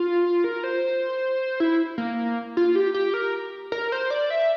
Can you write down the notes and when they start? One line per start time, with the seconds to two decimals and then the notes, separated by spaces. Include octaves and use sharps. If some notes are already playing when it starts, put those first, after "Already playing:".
Already playing: F4
0.44 A#4
0.64 C5
1.60 E4
1.98 A#3
2.57 F4
2.75 G4
2.94 G4
3.14 A#4
3.72 A#4
3.92 C5
4.10 D5
4.30 E5